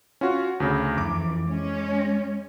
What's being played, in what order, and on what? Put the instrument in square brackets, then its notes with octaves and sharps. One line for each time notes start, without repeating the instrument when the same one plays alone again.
[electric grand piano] C#4 F4 F#4
D2 C#3
[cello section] F2 E3 [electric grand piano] D6
[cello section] G#3 C#4